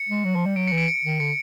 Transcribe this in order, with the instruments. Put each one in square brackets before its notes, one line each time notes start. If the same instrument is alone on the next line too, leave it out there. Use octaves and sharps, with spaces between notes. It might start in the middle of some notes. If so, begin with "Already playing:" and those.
Already playing: [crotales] C#7
[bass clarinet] G#3
F#3
F3
G3
[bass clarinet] F#3 [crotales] D7
[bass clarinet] E3 [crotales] C#7
[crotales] D7
C#7
[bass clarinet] D#3
[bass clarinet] D3 [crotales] C#7